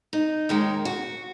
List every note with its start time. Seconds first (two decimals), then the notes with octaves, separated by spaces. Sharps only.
0.13 D#4
0.49 D#2 D#3 G#3 A#4
0.85 F#4